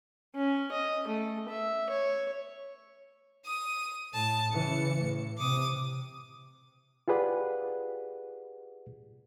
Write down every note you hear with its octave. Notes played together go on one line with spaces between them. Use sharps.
C#4
D#5
A3
E5
C#5
D#6 D#7
A2 A5
C#3 E3 C#7
A2
C3 D6 D#6
F4 G4 G#4 B4 D5 F#5